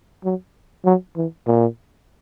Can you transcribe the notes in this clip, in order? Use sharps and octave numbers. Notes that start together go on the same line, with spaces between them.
F#3
F#3
E3
A#2